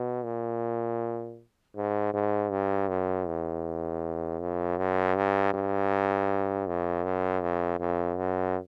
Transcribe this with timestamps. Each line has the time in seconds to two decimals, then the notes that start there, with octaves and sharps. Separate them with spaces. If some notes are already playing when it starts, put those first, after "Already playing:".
Already playing: B2
0.24 A#2
1.76 G#2
2.13 G#2
2.51 G2
2.89 F#2
3.27 E2
4.40 F2
4.78 F#2
5.16 G2
5.54 G2
6.67 F2
7.04 F#2
7.42 F2
7.79 F2
8.17 F#2